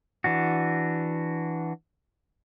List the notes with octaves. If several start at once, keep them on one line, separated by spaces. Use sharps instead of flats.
E3 D4 F#4